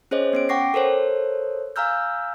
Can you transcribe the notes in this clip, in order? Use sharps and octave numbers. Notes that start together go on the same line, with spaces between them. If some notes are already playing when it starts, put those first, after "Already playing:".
C#4 G#4 C5 C#5 D#5
B3 C#4 D7
F#5 G5 C#6 D6 A#6 C7
A4 A#4 C5 C#5
F5 G#5 A#5 E6 F6 G6